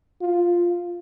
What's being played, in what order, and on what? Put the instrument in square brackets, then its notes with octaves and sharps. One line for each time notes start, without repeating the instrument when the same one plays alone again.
[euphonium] F4